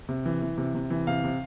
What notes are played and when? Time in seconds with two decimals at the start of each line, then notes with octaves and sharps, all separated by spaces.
0.09 C3
0.26 E3
0.42 E3
0.58 C3
0.75 C3
0.90 E3
1.07 C3 F5
1.24 C3